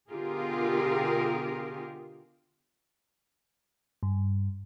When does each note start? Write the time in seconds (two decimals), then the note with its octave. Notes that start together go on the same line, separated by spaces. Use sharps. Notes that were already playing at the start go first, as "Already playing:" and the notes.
0.11 B2 D3 F4 G4 G#4 A#4
4.03 G2